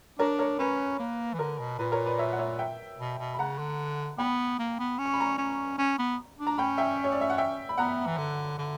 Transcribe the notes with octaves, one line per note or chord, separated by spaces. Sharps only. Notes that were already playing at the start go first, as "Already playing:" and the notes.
D4 A#4 C#5
A#4 C#5
C#4 B4
A#3
E3
D3 A#4
B2
A#2 B4
A#4 C#5
B4 D5
C#5 E5
F#5
C#5 E5
E5 G5
B2
B2
B5
C#3 F#5 A#5
D3
B3 G5 B5
A#3
B3
C#4
C#6
B5
A#5 C#6
C#4
C#4
B3
D4
A#5
C#4 G5 B5
E5 G5
C#5
D5
E5
F#5
E5 G5
B5
B3 F#5 A#5
E3
D3
D3